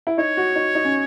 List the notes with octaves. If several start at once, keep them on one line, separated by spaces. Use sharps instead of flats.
E4
D#4 C#5
F#4
D#4
D#4
C#4